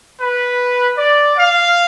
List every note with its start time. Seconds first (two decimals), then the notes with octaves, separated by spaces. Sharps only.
0.21 B4
0.98 D5
1.37 F5